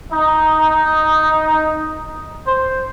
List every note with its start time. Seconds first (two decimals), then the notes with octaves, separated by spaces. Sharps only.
0.13 D#4
2.48 C5